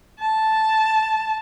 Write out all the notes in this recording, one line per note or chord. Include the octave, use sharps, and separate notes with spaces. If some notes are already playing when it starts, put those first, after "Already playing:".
A5